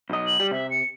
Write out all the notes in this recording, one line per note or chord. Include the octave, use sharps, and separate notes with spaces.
B1 D#5
F#7
G3
C3 E5
C#7